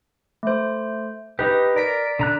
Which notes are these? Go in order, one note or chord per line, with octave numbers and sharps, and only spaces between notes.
A3 C5
D#4 G4 B4
A#4 D5 B6 D7
D3 A#5 F#6